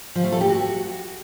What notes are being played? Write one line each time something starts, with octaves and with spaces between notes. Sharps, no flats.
F3
A3
A4
G4
F#4